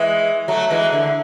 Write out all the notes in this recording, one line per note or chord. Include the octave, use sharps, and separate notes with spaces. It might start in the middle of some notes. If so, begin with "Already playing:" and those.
Already playing: E3 G#3
F#3 A3
E3 G#3
D3